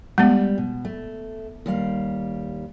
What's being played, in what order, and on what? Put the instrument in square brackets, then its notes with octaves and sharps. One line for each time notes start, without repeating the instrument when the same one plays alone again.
[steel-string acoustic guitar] G3 [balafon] G#3 B3
[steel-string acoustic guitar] B2
A3
D#2 G3 F5